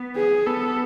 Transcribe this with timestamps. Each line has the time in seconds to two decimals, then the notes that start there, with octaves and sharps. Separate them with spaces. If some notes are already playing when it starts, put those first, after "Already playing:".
Already playing: B3
0.16 G#4
0.46 B3 A4